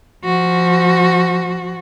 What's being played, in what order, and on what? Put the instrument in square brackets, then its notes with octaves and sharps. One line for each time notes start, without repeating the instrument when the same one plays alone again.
[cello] F3 F#4